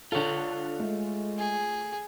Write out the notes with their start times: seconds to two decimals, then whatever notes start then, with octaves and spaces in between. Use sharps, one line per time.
0.12 D3 F4 A4 C#5
0.80 G#3 A3
1.38 G#4